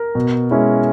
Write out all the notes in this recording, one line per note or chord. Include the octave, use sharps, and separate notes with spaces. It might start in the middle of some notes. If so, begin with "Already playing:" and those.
Already playing: A#4
B2
G#3 C#4 E4